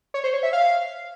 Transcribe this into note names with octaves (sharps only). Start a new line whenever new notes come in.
C#5
C5
C#5
E5
F5